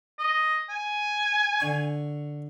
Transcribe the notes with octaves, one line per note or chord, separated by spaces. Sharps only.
D#5
G#5
D3 C#6